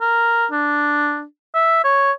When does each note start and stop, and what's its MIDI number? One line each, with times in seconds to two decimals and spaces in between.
0.01 0.46 70
0.51 1.23 62
1.55 1.83 76
1.84 2.12 73